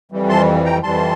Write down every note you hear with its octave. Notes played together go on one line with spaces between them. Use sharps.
F2 E3 G3
A5 C6
G5 A#5
F2 E3 G3 A5 C6